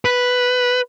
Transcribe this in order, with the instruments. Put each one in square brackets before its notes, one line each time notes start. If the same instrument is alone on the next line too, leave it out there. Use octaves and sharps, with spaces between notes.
[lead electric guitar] B4